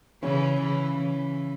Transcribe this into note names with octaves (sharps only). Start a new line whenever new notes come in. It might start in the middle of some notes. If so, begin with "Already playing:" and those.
C#3 E3 C#4 C#5
C#3 E3
C#3 E3